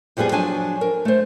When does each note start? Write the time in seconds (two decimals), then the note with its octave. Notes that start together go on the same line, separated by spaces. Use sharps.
0.17 F2 F3 G3 B3 G#4
0.32 F3 F#3 D4 G#5 A5
0.81 A#4
1.05 A3 C5